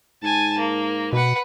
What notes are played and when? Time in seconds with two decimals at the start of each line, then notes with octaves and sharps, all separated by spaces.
0.23 G#2 G#5 A5
0.58 A#3
1.13 B2 B4 F#5